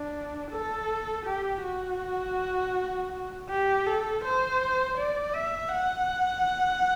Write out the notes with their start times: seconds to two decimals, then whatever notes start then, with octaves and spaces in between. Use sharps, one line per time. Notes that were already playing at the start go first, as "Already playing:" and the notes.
Already playing: D4
0.52 A4
1.26 G4
1.63 F#4
3.50 G4
3.86 A4
4.24 C5
4.98 D5
5.35 E5
5.73 F#5